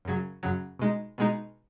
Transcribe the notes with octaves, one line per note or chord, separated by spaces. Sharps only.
F#2 C#3 F#3
F#2 C#3 F#3
B2 G#3 D#4
B2 G#3 D#4